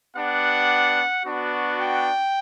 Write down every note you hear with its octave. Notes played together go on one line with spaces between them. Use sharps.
B3 D4 G4 F#5
B3 D4 F#4
G5